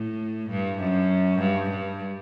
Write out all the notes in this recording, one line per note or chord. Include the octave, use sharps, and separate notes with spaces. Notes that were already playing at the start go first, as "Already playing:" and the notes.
Already playing: A2
G2
F#2
G2
G2